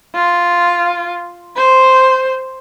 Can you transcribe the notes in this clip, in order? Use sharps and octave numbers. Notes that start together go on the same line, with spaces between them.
F4
C5